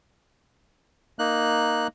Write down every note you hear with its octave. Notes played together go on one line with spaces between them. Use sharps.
A#3 D#4 F#6